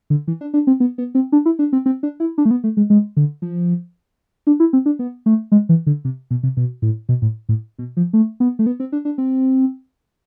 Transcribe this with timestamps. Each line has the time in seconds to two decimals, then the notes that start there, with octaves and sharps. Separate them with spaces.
0.10 D3
0.28 E3
0.41 D4
0.54 D4
0.67 C4
0.80 B3
0.98 B3
1.15 C4
1.32 D4
1.46 E4
1.59 D4
1.73 C4
1.86 C4
2.03 D4
2.20 E4
2.38 D4
2.45 A3
2.51 B3
2.64 A3
2.77 G#3
2.90 G#3
3.17 D3
3.42 F3
4.47 D4
4.60 E4
4.73 C4
4.86 D4
4.99 B3
5.26 A3
5.52 G#3
5.69 E3
5.87 D3
6.05 C3
6.31 B2
6.43 C3
6.57 B2
6.82 A2
7.09 B2
7.22 A2
7.49 A2
7.79 B2
7.97 F3
8.13 A3
8.40 B3
8.59 A3
8.66 B3
8.80 C4
8.92 D4
9.05 D4
9.18 C4